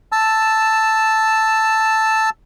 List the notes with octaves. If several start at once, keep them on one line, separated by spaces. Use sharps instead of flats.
A5 E6